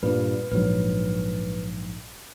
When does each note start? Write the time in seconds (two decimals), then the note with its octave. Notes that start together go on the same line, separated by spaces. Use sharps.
0.03 G2 A#2 B4
0.52 A#1 G#2 F#3 B4